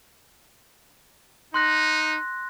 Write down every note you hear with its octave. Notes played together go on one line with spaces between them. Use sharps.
D#4 C6 F#6 A#6